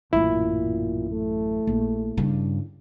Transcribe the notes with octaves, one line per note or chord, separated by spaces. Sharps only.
A1 F#2 A#2 E4
A3
A#1
G2 C#3